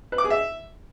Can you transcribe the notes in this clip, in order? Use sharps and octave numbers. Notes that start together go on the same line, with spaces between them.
B4
D6
G#4
E5